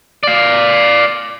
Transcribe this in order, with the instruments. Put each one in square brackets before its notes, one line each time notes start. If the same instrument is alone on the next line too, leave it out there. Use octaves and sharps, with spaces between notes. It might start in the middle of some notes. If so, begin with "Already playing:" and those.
[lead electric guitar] D5 F5